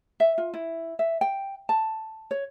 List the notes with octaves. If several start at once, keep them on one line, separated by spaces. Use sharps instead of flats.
E5
F4
E4
E5
G5
A5
C#5